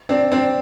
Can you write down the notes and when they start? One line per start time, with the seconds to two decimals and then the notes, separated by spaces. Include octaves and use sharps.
0.09 C4 D4
0.32 C4 D4